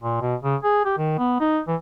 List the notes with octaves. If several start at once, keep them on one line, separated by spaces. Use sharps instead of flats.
A#2
B2
C#3
G#4
G4
D#3
B3
D#4
E3